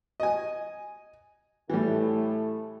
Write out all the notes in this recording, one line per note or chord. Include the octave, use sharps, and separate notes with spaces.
D#5 G#5
A2 E3 G3 A3